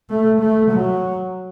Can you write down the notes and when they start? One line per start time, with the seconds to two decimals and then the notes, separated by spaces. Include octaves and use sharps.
0.10 A3
0.41 A3
0.71 F#3